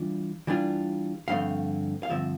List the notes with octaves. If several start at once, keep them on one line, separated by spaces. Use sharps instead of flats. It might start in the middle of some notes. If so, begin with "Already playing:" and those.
Already playing: E3 G3 D4 F4
E3 G3 D4 F4
G2 D3 F3 A3 C4 F5
F5
G2 D3 F3 C4 E5